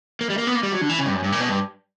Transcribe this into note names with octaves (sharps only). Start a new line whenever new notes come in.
A#3
G3
A#3
B3
A#3
G3
F#3
D3
E3
C#3
G2
F#2
G2
A#2
B2
G2